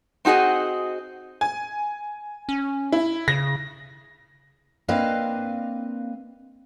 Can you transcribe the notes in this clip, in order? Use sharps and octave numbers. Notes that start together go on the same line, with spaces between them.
C4 D#4 F#4 G#4 D#5
G#5
C#4
E4
C#3 A#6
A#3 C4 D4 B4 D#5 F5